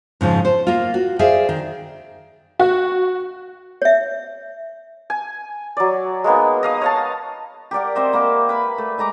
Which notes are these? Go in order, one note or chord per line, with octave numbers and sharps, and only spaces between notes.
G#2 C#3 F3
C5
A#3 F4
F#4
G#4 C5 D5 E5 F5 G#5
D#3
F#4
C#5 E5
G#5
F#3 D5
G#3 A#3 B3 D#4
D#5 F5 D#6
C#5 F5 A5
G4 A#4 D5 F#5
C4 C5 D#5 E5
A#3 B5 D6
B4 B5
A3
G#3 D#5 A#5 D6